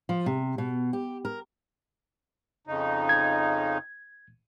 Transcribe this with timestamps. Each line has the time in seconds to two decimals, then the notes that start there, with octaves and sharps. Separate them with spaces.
0.09 F3
0.26 C3
0.58 B2
0.93 G4
1.25 A#4
2.67 F2 C#3 D#4
3.09 G#6